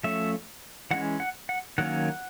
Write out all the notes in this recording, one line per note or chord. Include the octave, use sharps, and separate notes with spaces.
F3 A3 C#4 E5
E3 G#3 C#4 F#5
F#5
F#5
D#3 F#3 A#3 C#4 F#5